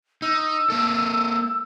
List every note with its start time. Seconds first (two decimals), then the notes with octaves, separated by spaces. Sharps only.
0.22 D#4 E6
0.70 A#3 A4